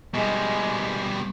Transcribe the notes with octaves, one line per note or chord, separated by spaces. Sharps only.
B2 G3 G#3